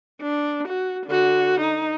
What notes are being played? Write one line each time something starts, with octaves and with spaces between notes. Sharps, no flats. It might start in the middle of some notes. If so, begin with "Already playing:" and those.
D4
F#4
D3 F#4
D#4